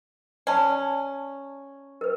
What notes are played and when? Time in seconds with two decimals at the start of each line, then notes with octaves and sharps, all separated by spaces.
0.47 C#4 D5 A5
2.01 A#4 B4